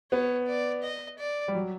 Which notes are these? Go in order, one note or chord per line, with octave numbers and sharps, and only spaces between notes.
B3 C#5
D5
D#5
D5
G3
F#3